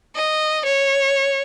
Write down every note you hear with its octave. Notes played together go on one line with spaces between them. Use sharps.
D#5
C#5